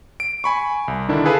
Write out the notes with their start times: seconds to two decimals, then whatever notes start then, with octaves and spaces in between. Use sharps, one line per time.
0.20 D7
0.44 G#5 B5 C#6
0.88 C2
1.09 D3 D#3 D4 E4
1.25 G#4 A4 B4 F5 A5